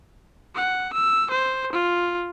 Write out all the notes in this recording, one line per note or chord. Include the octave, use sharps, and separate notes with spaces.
F#5
E6
C5
F4